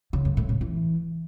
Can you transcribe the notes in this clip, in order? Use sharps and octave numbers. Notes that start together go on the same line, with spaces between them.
C#3
F#2
A2
C#3
E3